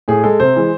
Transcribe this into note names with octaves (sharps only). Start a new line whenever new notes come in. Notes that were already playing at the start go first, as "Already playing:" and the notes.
A2 G#4
G#3 A4
C3 C5
E3 G#3